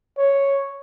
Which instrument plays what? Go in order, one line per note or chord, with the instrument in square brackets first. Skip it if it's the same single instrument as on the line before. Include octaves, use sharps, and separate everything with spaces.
[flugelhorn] C#5